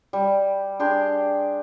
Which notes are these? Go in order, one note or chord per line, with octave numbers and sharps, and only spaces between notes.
G3
D4 G4 G#4 C6